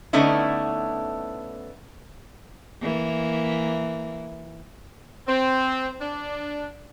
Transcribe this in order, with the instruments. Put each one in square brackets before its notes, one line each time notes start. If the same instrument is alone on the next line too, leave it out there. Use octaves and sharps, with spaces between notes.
[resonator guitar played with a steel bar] D3 A3 B3 C#4 D#4 E4
[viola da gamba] E3 A#3
[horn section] C4
D4